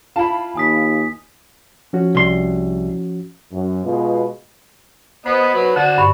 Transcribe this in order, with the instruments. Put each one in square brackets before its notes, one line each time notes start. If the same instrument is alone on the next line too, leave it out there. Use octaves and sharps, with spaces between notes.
[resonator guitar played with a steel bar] E4 A5 [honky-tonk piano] F4 B5
[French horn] D#2 [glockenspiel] G#5 D#6 B6
[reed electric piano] F3 C#4 F#4
[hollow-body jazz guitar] C2 C6
[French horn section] F#2
B2 G#3 F4
[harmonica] B3 D#5 B5 [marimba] C5
[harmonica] F#3 B4
[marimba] D3 [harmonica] F#4 F#5 A5
[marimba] G2 C#6